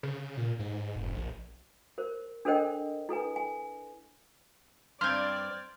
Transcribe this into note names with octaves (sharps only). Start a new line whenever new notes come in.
C#3
A#2
G#2
F1
A#1
A#4 C5
D4 A4 A#4 C5 D#5 G5
E4 A4 B4 G#5
G#5
G2 C4 D5 C6 F6 G6 G#6